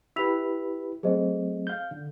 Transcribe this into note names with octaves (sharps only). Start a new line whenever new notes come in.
E4 G4 B4 E6 B6 F7
F#3 A3 C4 G#4 C5 D#5
F5 G6
D3